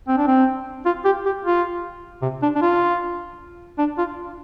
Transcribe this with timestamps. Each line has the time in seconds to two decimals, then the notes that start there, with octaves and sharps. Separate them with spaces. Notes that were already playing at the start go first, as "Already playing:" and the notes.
0.08 C4
0.17 D4
0.27 C4
0.86 F4
1.05 G4
1.26 G4
1.45 F4
2.22 C3
2.42 D4
2.55 D4
2.62 F4
3.78 D4
3.98 F4